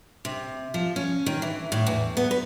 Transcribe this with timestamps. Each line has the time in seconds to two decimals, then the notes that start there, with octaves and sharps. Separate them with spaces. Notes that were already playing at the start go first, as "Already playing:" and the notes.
0.25 C3
0.74 F3
0.96 C#4
1.26 D#3
1.42 E3
1.72 A2
1.87 E2
2.17 B3
2.31 B4